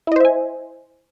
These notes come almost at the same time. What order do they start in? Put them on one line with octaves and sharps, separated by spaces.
E4 D#5 C5 E5 G#5